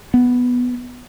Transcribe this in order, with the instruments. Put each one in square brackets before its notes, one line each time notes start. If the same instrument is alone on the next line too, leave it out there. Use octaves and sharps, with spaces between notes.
[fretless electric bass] B3